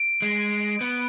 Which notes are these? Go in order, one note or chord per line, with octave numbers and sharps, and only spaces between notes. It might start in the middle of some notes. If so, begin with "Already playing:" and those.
Already playing: D7
G#3
B3